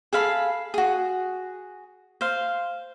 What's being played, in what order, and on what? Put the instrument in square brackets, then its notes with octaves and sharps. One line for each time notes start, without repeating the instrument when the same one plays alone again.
[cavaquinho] G#4 A4 F5 B5
F#4 G#4
C5 F5